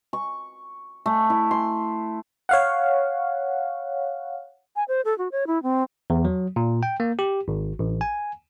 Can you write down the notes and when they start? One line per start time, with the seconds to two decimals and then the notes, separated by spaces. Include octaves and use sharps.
0.13 C#6
1.06 A3
1.30 E4
1.51 C6
2.49 C#5 F5 F#5
4.76 G#5
4.88 C5
5.05 A4
5.18 F#4
5.32 C#5
5.47 E4
5.63 C4
6.10 E2
6.25 F#3
6.56 A#2
6.83 G5
7.00 A#3
7.19 G4
7.48 G#1
7.79 A1
8.01 G#5